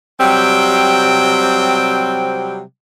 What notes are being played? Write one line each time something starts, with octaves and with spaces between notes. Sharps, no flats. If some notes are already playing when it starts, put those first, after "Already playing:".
C3 F#3 G3 C4 G5